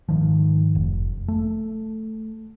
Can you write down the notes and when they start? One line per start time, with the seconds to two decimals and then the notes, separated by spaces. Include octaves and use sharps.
0.09 G#2 D#3 F3
0.75 F1
1.28 A3